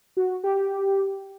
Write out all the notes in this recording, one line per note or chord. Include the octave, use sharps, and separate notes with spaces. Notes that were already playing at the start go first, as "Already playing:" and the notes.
F#4
G4